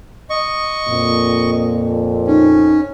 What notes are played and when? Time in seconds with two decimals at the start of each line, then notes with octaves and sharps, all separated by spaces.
0.30 D#5 C#6
0.88 F2 A#2
2.27 C#4 D#4